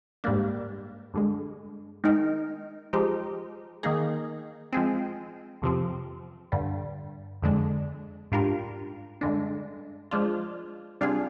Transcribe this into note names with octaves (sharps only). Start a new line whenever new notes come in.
G#2 G3 A#3 D4
G2 D3 G#3
D#3 G#3 D#4 A#4
F3 G#3 D#4 G4
D#3 A#3 D#4 G#4
F3 G#3 C4
F2 C3 F3 C4
G2 D3 G3
F2 D3 G#3 D4
G#2 G3 D4 F4 A#4
G2 D3 G#3 D4
F3 G#3 D4 F4
C3 G3 D4 F4 G#4